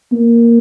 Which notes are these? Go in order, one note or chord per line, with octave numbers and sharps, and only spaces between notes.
A#3